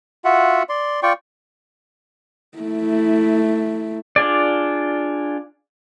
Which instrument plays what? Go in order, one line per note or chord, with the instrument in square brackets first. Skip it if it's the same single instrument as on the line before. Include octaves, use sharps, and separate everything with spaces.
[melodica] F4 F#4 E5 F#5
D5 C6
F4 D5 G5 C#6
[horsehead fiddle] A3 E4
[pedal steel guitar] D4 F4 G#4 D5